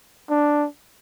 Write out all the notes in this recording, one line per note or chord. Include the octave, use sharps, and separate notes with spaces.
D4